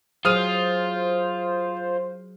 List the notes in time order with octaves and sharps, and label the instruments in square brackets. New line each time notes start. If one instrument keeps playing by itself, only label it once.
[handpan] F#3 G#4 [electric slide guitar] F4 [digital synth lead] C5 [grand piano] D#6 F6 D#7